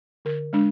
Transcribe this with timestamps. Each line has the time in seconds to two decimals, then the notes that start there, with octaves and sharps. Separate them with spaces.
0.25 D3 A#4
0.53 G#3 D4